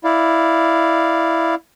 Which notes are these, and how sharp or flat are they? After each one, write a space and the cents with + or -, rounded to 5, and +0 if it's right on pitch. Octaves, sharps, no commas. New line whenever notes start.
E4 +0 D5 +0 F5 +0